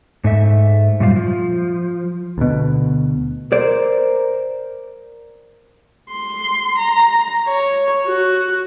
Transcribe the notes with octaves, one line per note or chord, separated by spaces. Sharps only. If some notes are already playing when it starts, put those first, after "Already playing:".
G#2 A3 E5
F#2 A#2 G3 F4
F3
D2 B2
A#4 C5 D5
C6
A#5
C#5
F#4